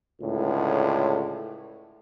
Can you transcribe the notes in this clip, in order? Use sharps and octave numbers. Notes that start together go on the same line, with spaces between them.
C#2 A2 D3